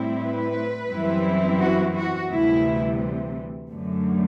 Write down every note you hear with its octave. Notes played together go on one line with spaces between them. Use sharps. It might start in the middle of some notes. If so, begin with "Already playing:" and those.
Already playing: A2 G3 C4 E4
B4
F#2 E3 G3 C4 E4
F#4
F#4
D2 C3 E3 G3 E4
F#2 D3 A3